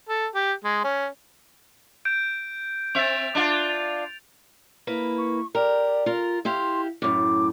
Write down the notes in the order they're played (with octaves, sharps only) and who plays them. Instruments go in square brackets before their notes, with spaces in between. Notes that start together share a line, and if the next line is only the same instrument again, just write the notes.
[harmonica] A4
G4
G#3
C#4
[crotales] G6 D7
[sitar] C4 E5 [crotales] A6 F7
[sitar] D4 F4
[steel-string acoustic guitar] A#3 E4 B4
[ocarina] C#6
[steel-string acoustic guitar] G4 A#4 [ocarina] D5
[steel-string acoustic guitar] F4 A#4
[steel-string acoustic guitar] E4 G4 F5 [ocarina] C6
[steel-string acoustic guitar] F#2 A2 [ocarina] D6